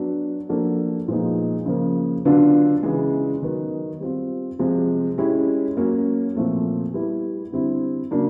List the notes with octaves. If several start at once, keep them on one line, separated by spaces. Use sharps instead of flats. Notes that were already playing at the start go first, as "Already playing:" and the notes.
Already playing: F#3 B3 D4
F3 A#3 D4 F#4 A4
A#2 F3 G#3 B3 D#4
C#3 F3 A#3
D3 F#3 B3 D4 F4
C#3 E3 G#3
D#3 F#3 B3
G3 C4 F4
C3 F3 G#3
G#3 C#4 E4 G4
F#3 A#3 C#4
A#2 F3 A3 C4
G3 B3 E4
D3 G3 C4 E4
C#3 F#3 A#3 D4